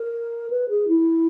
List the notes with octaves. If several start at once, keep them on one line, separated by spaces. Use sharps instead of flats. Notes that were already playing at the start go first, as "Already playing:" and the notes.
Already playing: A#4
B4
G#4
E4